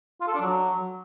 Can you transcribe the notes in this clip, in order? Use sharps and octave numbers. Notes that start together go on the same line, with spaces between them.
F4
A4
D4
F#3